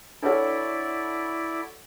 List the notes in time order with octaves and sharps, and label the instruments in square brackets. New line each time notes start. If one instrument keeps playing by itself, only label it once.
[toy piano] D4 B4 C#5 [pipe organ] E4 D5 [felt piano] F#4 A4